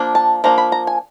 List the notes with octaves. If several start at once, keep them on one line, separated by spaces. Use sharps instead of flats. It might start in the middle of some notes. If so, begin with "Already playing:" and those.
Already playing: F3 A#3 D4
A5
F3 A#3 D4 A#5
B5
A#5
G#5